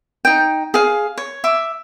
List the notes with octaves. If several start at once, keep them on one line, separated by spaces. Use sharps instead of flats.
D#4 G5
G#4 F5
C#5
E5 D6